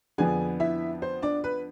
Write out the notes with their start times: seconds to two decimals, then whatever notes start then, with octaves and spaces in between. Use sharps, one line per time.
0.18 F2 D3 F3 B3 D4 G#4 G#5
0.60 E4 E5
1.02 C5
1.22 D4 D5
1.44 B4